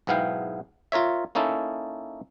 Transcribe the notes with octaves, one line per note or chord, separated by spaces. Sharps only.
B1 G#2 B3 E4 F5 G5
F4 A#4 C#5 E5
A#3 C#4 D#4 E4 A4